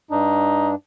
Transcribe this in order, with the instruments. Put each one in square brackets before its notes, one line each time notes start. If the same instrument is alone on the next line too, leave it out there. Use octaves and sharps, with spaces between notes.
[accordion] G2 D4 [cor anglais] D#4